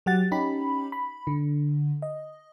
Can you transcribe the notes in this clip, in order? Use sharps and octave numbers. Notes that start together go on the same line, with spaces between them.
F#3 G4 F#5 A6
C#4 D#4 G4 B5
B5
D3
D#5